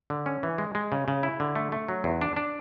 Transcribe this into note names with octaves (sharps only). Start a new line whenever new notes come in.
D3
C#4
E3
G#3
G#3
C#3
C#3
E4
D3
A3
A3
F#3
E2
D4
D4